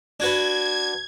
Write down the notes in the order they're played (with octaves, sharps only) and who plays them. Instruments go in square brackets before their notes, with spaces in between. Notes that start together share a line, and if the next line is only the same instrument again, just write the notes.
[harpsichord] D4 F#4 B4 [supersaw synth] G#6